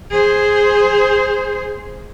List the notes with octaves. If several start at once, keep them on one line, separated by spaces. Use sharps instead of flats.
G#4 C5